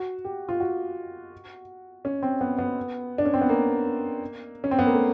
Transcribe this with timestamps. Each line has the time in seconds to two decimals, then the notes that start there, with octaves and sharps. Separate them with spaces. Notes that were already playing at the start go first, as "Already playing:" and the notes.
Already playing: F#4
0.25 G4
0.49 F4
0.60 F#4
2.05 C#4
2.23 C4
2.41 B3
2.58 B3
3.18 D4
3.25 C#4
3.34 C4
3.41 B3
3.49 A#3
4.64 C#4
4.71 C4
4.79 B3
4.86 A#3
4.93 A3